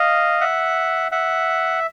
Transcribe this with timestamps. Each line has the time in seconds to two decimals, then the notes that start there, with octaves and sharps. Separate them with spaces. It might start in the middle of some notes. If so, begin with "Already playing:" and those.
Already playing: D#5 F5
0.41 E5 F#5
1.12 E5 F#5